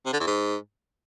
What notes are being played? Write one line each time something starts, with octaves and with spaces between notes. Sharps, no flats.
C3
D3
E2
G#2